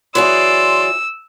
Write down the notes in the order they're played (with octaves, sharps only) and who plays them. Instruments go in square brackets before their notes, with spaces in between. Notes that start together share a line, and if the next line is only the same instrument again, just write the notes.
[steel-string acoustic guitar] E3 F#3 G#4 [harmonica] D5 C6 [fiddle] E6